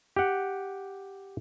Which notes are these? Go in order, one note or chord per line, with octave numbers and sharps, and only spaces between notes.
G4 F#5